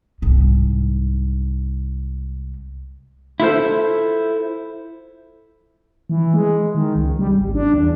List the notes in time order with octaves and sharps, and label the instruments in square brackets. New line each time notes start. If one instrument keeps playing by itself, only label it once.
[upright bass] C2 G#2
[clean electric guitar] E4 F4 A4 C5
[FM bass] E3
G#3
D#3
C#2
G3
G#1
D4
E2